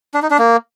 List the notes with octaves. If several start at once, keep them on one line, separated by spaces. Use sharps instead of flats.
D4
D#4
D4
A#3